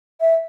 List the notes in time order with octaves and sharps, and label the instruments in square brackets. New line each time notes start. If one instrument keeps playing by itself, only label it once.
[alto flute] E5